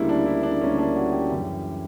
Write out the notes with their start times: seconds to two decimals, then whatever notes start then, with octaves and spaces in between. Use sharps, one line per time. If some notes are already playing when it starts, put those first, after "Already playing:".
Already playing: D2 C#3 G3 A#3 E4
0.09 D4
0.26 E4
0.43 D4
0.61 D2 C#3 G3 A#3 C#4
0.78 D4
0.96 F#4
1.12 G4
1.31 F#2 C#3 E3 G3